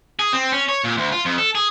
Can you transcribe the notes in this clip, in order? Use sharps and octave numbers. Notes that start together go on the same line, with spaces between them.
G#4
C4
C#4
C#5
A#2
D2
F4
F2
A4
G#4